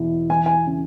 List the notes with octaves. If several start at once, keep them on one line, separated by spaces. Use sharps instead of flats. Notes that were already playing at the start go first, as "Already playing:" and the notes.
Already playing: E2 B2 E4
E3 G#5
G#5
C#3